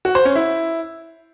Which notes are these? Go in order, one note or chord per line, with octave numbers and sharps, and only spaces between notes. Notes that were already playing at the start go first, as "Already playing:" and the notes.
F#4
C5
C#4
E4